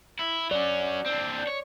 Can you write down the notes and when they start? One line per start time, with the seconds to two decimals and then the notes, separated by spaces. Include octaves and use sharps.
0.19 E4
0.51 F#3 C#4 D5
1.06 C4 D4
1.47 C#5